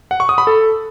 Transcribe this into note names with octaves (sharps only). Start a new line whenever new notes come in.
F#5
C#6
D#6
B5
A4